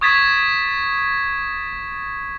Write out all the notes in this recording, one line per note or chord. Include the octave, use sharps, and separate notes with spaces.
C#6 D#6 G#6 A6 B6 E7